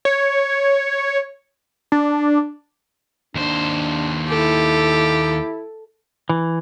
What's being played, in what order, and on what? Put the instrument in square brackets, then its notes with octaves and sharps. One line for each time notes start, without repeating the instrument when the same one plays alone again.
[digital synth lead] C#5
D4
[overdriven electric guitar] D#2 C5 [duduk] D4
[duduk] E4 [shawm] G4 [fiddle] A4
[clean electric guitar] E3